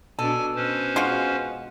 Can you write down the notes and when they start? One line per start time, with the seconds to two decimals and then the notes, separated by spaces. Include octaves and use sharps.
0.19 B2 D4 A4 G#5
0.55 B2 C#4 B4 C5
0.96 G#3 F4 F#4